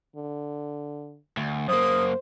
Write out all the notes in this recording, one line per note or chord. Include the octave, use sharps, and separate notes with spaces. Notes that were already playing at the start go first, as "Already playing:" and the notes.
D3
D2
F#2 A#3 C5 D#6